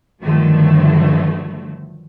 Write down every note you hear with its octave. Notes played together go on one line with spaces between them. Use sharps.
G2 D3 D#3 F3 F#3 A3